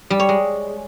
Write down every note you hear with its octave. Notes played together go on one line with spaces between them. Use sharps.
G3
C#5
G#3